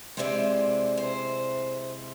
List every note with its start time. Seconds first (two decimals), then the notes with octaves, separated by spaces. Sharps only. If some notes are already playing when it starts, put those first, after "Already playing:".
0.17 C3 G#3 C4 E4 D5
0.97 C5